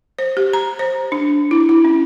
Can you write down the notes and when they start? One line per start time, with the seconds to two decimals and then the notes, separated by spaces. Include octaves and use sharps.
0.19 C5
0.37 G4
0.53 A#5
0.79 C5
1.12 D4
1.51 E4
1.69 E4
1.85 C#4